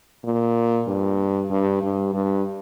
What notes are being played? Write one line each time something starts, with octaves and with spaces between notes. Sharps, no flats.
A#2
G2
G2
G2
G2